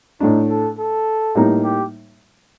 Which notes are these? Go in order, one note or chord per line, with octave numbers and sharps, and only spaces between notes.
A2 A3 D4 D#4
A4
A4
A2 G3 A#3 D#4
G4